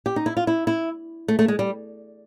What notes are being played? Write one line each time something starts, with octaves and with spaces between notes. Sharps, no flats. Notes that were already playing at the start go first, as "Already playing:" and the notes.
G4
D#4
E4
F4
E4
E4
A3
A3
G#3
G3